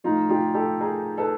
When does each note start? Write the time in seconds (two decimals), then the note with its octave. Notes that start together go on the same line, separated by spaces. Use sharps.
0.04 A2 F3 D#4 F4
0.29 F4 G4
0.54 G4 A4
0.80 G#4 A#4
1.18 A4 B4